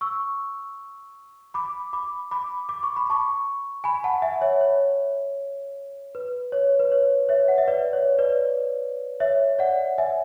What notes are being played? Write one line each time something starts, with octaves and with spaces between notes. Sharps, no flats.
C#6 E6
B5 D6
B5 D6
B5 D6
D6
C#6
B5
A5 C#6
G#5 B5
F#5 A5
E5 G#5
C#5 E5
C#5
B4
C#5
B4
C#5
C#5 E5
F#5
E5
B4 D5
C#5
B4 D5
C#5 E5
D5 F#5
E5 G#5